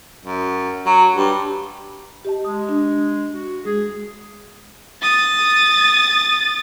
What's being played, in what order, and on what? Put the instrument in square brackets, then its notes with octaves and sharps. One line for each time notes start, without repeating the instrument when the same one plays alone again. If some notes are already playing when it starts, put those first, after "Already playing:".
[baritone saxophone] F#2
F#3
G2
[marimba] G4 D#5 A5
[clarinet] G#3 [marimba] D#6
[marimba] D4
[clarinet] F#4
[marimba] G#3 [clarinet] G#4
[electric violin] D#6 A6